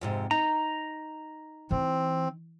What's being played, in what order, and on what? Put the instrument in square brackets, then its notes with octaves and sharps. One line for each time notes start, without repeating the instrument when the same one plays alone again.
[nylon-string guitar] F2 G#2 C3
[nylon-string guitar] D#4 [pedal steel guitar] A#5
[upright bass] E3 [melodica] C4